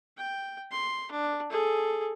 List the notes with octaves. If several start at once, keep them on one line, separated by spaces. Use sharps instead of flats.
G5
C6
D4
G#4 A4